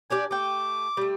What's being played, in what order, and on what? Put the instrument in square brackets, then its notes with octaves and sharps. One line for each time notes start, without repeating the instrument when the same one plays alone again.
[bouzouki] D4 G4 D5 [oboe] G#5
[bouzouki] A3 G5 [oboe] D6
[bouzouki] G3 A3